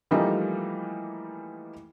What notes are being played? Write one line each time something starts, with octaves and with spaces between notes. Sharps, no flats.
E3 F3 G3 A3 A#3 D#4